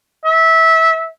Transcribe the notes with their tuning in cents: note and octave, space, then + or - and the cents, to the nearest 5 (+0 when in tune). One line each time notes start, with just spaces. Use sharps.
E5 -20